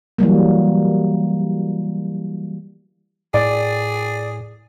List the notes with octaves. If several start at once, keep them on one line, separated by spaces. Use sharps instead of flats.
E3 F#3 G3 A#3
A2 G#4 D5